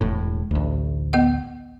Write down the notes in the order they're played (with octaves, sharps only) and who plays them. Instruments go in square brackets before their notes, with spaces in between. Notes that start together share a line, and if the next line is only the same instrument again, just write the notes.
[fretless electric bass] E1 A2
A1 D2
[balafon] B3 D#5 F#5